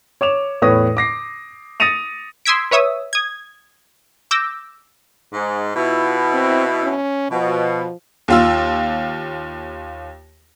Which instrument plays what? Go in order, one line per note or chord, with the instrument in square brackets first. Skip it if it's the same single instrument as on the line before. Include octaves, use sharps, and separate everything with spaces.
[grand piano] C#5 D6 E7 F7
E2 A2 B4 C#5 D#6 A#6
D6 A#6 C7
D#6 A6 A#6 C#7 D#7 F7
[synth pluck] C6 D#6 E6 G#6 B6 D7
B4 C#5 E5 D#6 E6
D#6 G#6
D6 E6 G6 A#6
[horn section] G#2
[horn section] B2 E4 [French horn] F4
[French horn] C4
C#4
[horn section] B2 [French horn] F3
[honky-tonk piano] D#2 F4 E6